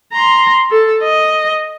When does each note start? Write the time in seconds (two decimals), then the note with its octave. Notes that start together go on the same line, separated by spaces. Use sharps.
0.13 A#5 C6
0.71 A4
1.03 D#5